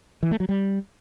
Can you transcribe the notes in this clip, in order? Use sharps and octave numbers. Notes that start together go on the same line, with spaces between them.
E3
A3
F#3
G3